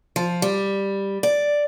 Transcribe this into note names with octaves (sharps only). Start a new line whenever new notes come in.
F3
G3
D5